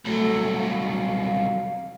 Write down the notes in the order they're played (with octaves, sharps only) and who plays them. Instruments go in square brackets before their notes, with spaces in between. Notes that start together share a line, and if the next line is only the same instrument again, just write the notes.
[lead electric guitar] C2 F#3 [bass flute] A3
[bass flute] F5